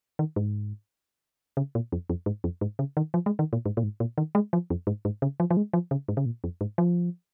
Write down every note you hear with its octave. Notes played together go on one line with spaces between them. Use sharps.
D#3
G#2
C#3
A#2
F2
F2
G#2
F2
G#2
C#3
D#3
F3
G#3
D#3
A#2
G#2
A#2
G#2
A#2
D#3
G#3
F3
F2
G#2
G#2
C#3
F3
F3
G#3
F3
C#3
G#2
C#3
A#2
F2
G#2
F3